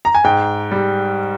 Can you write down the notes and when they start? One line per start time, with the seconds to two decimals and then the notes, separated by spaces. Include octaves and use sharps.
0.05 A#5
0.15 G#5
0.24 G#2 G5
0.71 G3